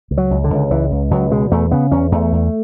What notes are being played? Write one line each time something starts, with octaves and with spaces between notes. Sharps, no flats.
C#2
F#3
C#2
D3
C#2
C#2 E3
C#2
C#2 F#3
B2 G#3
E2 A3
C#3 B3
E2 C#4
E2 A3
E2